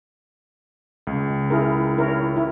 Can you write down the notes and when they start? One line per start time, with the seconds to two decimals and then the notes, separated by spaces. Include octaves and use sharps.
1.07 C#2
1.50 E4 G#4 A#4
1.97 E4 A#4 C#5
2.36 E4